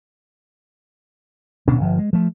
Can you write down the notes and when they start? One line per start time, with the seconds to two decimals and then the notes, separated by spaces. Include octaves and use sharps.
1.68 D1 B2 C#4 D4
1.81 G1 F3
1.99 G#3
2.13 F3 A3